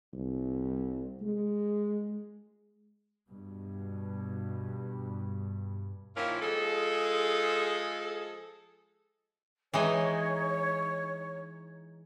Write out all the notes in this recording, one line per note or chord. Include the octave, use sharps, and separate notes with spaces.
C2
G#3
G2 B2
D#3 F3 A#3 C#4 E4 F4
F3 G#3 G#4 A4
E3 G#3 D#4 C#5